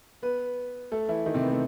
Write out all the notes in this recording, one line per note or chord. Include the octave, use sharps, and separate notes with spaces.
B3 B4
A3 A4
E3 E4
D#3 D#4
C3 C4
B3
A3